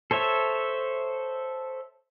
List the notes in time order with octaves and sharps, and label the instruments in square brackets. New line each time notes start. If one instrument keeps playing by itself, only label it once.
[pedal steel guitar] A4 C5 C#5 E5